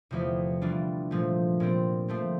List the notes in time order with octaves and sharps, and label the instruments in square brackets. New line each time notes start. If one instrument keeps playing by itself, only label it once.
[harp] E2 C3 F3 A3 E4
E3 G3 D4 F4
A#2 F3 A3
A#2 G3 C4
F3 A3 C4